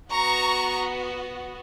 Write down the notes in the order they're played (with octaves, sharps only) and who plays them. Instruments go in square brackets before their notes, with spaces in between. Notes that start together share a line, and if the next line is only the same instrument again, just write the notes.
[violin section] B3 F#4 A#5 C#6